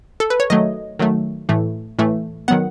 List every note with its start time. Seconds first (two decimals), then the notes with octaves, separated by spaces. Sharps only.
0.20 A4
0.30 B4
0.40 C#5
0.50 D#3 F#3 A3 D#5
0.99 D#3 F#3 A3
1.49 A2 E3 A3
1.99 A2 E3 A3
2.48 D#3 F#3 B3 F#5